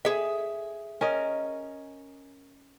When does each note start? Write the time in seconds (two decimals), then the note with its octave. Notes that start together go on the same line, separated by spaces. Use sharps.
0.05 G#4 E5
1.01 C#4 A#4 D#5